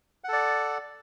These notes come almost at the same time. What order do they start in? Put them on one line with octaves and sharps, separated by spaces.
F#5 A4 D5